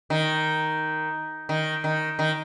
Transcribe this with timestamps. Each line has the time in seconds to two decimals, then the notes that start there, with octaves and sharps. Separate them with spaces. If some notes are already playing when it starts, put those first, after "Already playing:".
0.10 D#3
1.49 D#3
1.84 D#3
2.19 D#3